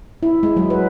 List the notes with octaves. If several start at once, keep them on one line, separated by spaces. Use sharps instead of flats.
E4
G#3
F#3
B4